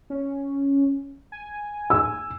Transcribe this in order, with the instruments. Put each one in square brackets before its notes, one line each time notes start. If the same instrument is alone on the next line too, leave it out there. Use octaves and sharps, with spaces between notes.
[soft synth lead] C#4
G#5
[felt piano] E6